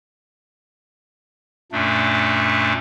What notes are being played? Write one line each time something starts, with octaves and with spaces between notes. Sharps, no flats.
F#2 A#2 A3 D4